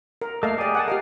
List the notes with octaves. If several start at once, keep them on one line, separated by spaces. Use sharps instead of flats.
A#4
A3 A#3 D#5 F5
G4 G#4 A#4 D5
F#5 G#5 A5
G4 A#4 D#5 F5